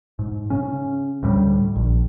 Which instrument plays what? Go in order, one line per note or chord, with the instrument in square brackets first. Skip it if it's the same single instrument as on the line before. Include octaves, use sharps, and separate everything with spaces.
[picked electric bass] G#2
C#3 C#4
D2 A2 G3
A#1